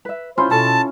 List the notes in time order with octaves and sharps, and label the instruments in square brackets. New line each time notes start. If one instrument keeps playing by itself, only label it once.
[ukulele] B4 E5
[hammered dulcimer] C#4 E4 F4 [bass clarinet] C5 [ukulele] C#5
[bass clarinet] B2 [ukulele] A4 [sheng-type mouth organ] A5